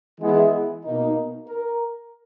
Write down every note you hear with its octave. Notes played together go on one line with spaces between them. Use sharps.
E3 G#3 B3 E4
B2 A#3 D#4
A#4